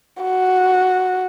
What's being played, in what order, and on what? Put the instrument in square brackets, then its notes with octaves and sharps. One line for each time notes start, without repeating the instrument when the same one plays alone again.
[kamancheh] F#4